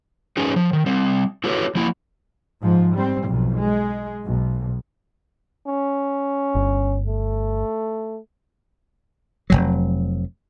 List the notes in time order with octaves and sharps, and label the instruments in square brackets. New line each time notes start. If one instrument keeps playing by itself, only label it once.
[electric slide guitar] C#4 D#4 G#4 B4
F3
D#3
G3 C4
E4 F#4 G4 A4 B4 C#5
F3 A#3 E4
[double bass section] G#2 F3
G3 C4
B1 F2
G#3
B1
[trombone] C#4
[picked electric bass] G1
[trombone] A3
[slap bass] F1 B1 F#3